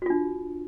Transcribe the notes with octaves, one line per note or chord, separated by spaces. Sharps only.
D4 F4 F#4